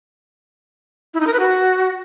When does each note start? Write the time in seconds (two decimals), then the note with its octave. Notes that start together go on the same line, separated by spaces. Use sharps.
1.14 E4
1.20 D#4
1.27 A#4
1.33 B4
1.39 F#4